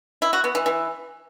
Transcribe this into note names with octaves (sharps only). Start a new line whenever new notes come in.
E4
F#4
B3
E3
E3